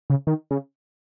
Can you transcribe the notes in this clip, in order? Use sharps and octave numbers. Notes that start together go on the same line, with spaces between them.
C#3
D#3
C#3